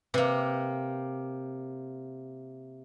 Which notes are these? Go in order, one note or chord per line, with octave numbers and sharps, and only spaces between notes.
C3 A#3 B4